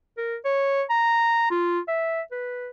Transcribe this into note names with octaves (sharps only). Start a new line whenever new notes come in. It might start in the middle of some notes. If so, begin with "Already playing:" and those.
A#4
C#5
A#5
F4
E5
B4